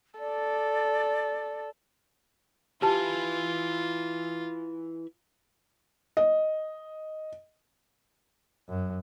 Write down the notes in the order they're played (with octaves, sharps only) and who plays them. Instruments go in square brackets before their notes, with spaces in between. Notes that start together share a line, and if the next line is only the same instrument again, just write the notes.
[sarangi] A4 [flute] D5
[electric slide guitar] E4 B4 G#5 [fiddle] F4 [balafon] G4 A5
[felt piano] D#5
[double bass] F#2